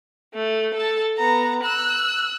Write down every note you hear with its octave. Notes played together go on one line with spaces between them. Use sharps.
A3
A4 A5
B3 A#5
E6 F#6